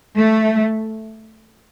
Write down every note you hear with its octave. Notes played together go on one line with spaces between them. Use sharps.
A3